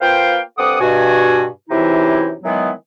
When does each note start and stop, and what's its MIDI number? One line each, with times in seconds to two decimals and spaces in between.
0.01 0.38 58
0.01 0.38 65
0.01 0.38 71
0.01 0.38 72
0.01 0.38 77
0.01 0.38 79
0.57 0.78 43
0.57 0.78 60
0.57 0.78 69
0.57 0.78 78
0.57 0.78 86
0.57 0.78 87
0.80 1.45 43
0.80 1.45 47
0.80 1.45 66
0.80 1.45 80
1.70 2.33 42
1.70 2.33 48
1.70 2.33 52
1.70 2.33 63
1.70 2.33 64
2.44 2.70 51
2.44 2.70 52
2.44 2.70 54
2.44 2.70 56
2.44 2.70 59